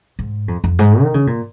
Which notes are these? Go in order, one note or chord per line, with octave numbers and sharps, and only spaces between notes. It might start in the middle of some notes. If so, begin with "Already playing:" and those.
G#2
F2
F2
G#2
D#3
C#3
A#2